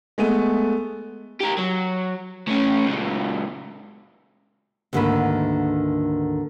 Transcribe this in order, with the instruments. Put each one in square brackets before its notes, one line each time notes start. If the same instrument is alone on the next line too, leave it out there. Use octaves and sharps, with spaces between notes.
[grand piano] G#3 A3 B3 D#7
[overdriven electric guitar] G4 A#4
F#3
A2 C#4
C#2 A#2
[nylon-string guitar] D2 G#2 D3 D#3 A#3 B4